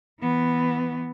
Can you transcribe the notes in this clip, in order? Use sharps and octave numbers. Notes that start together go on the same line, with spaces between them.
E3 B3